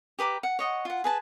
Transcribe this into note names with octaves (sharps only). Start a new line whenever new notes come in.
G4 B4 A#5 D6
F#5
C#5 D#5 F#5
F4 F#5
G#4 B4 A5